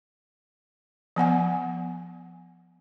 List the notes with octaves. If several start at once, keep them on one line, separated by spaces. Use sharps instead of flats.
F3 B3 F#5 G#5